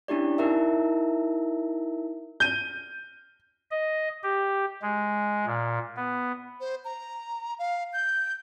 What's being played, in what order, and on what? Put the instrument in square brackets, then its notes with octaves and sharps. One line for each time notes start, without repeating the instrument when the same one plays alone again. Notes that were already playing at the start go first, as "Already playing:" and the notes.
[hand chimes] C#4 D4 E4 G4 D5
D#4 E4 A#4 E5
[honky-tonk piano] G6 D#7
[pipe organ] D#5
G4
G#3
A#2
B3
[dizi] C5
A#5
F5
G6